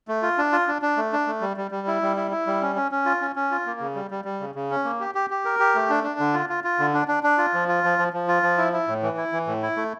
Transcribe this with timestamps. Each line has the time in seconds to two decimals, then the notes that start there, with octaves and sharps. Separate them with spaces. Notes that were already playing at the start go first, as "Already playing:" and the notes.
0.08 A3
0.22 F4
0.38 D4
0.52 F4
0.68 D4
0.82 D4
0.97 A3
1.13 D4
1.27 A3
1.41 G3
1.57 G3
1.71 G3
1.87 E4
2.02 G3
2.17 E4
2.31 E4
2.47 G3
2.62 C#4
2.76 C#4
2.92 C#4
3.06 F4
3.21 C#4
3.36 C#4
3.51 F4
3.66 A#3
3.80 C#3
3.95 G3
4.11 G3
4.25 G3
4.40 C#3
4.55 C#3
4.71 C#4
4.84 A#3
5.00 G4
5.15 G4
5.30 G4
5.45 A#4
5.59 G4
5.75 A3
5.90 D4
6.04 D4
6.20 D3
6.33 F4
6.49 F4
6.64 F4
6.79 D3
6.94 D4
7.08 D4
7.23 D4
7.38 F4
7.54 F3
7.68 F4
7.84 F3
7.99 F3
8.13 F3
8.28 F4
8.43 F3
8.58 E4
8.73 E4
8.88 A2
9.03 E3
9.17 E4
9.32 E3
9.47 A2
9.62 E4
9.76 A3